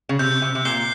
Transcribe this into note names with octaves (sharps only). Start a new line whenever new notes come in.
C#3
C3 G6
C3
C3
A#2 C7 G7